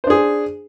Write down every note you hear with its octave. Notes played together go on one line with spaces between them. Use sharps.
D4 G#4 C5